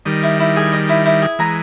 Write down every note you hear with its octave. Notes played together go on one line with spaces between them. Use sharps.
D#3 G3 D#5
E4
E4
G#4
D#5
E4
E4
G#4
E3 G#3 A#5